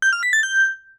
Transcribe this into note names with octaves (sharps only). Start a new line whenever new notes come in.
G6
F6
B6
A6
G6